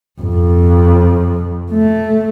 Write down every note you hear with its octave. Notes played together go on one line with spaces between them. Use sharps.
F2
A3